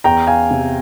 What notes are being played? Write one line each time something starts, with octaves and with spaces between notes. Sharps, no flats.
E2 G5 A#5
F5 G#5
C3